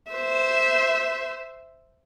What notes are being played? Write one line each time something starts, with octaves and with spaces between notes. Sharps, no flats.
C5 E5